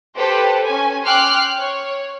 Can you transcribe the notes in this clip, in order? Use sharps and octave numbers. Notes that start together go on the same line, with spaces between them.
G4 A4 B4 C5
C#4 G#5
G5 C6 D6 F6 F#6
C#5